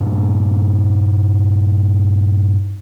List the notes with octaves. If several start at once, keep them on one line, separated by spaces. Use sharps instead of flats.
G2 A#2 D4